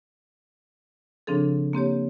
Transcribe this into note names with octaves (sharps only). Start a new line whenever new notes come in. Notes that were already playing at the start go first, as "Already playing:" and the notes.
C#3 F3 C4 D4 G#4 A4
A#3 C4 G4 C#5